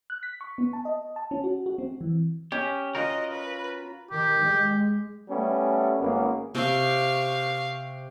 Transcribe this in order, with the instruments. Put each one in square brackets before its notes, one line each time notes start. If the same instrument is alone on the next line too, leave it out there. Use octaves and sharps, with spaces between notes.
[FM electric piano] F#6
B6
C#6
B3
A5
D#5
A5
C#4
F#4
F#4
C4
E3
[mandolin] C#4 [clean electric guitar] G4
[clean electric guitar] F4 F#4 A#4 [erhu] D#5
[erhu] B4
[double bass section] D#3 [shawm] G4
[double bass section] G#3
[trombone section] G3 A3 B3 C#4
G#1 A#3 B3 C#4
[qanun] C3 [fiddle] F5 C#6